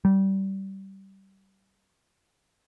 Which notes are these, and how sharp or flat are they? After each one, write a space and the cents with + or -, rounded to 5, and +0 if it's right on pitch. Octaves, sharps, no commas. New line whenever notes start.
G3 -20